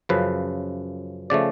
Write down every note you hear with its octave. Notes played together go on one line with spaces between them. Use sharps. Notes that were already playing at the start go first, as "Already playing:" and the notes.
F#2 C#3 F3 B4
C#3 F3 A3 D5